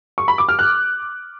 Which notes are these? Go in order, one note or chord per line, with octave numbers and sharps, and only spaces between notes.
C#6
B5
D6
F6
F#6